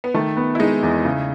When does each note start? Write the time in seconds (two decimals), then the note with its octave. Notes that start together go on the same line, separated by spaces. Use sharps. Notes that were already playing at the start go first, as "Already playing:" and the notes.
0.04 B3
0.14 D#3 A3
0.37 B3
0.55 E4
0.59 G#3 D#4
0.83 E2
1.05 C#3